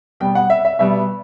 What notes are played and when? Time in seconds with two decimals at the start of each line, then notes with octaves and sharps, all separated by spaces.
0.20 B2 G3 B3 G5
0.35 F#5
0.50 E5
0.65 E5
0.79 B2 G3 B3 E5